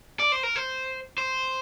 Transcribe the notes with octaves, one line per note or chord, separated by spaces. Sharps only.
D5
C5
A#4
C5
C5